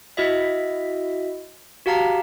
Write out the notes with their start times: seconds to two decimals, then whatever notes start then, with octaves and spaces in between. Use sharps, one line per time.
0.17 E4 F#4 D#5 E5
1.86 F#4 G4 F5 A5 A#5